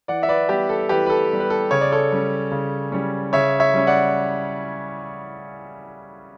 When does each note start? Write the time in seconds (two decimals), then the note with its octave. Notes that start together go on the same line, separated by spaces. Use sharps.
0.08 E3 D5 F#5
0.23 E5
0.29 B4 D5
0.49 G3 B3 G4
0.69 A4
0.89 E3 G4 B4
1.06 B4
1.10 A4
1.30 G3 B3
1.40 B4
1.50 A4
1.71 C#3 C#5
1.81 D5
1.92 A4 C#5
2.12 G3 C#4
2.51 C#3
2.92 G3 C#4
3.33 C#3 C#5 E5
3.60 C#5 E5
3.74 G3 C#4
3.87 D5 F#5